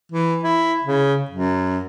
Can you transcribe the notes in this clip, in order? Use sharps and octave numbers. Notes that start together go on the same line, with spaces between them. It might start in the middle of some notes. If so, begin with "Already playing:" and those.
E3
E4
C#3
F#2